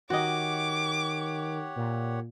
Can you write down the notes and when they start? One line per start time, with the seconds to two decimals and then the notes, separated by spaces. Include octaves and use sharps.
0.10 D#3 F#4 G4 C#5 D#5 F#5 D6
1.76 A#2